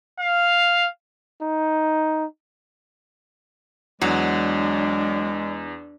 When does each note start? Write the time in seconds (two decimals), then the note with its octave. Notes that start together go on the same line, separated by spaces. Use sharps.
0.20 F5
1.42 D#4
4.02 E2 F#3 G#3 D4